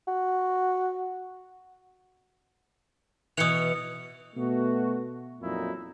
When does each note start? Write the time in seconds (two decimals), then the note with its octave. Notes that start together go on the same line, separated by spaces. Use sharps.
0.08 F#4
3.37 B2 E3 D#6 C#7 F7
4.36 B2 A3 B3 F#4
5.41 F2 A#2 F#3 D#4 E4